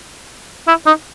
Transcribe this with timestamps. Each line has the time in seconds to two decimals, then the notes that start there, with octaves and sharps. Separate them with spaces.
0.68 E4
0.86 D#4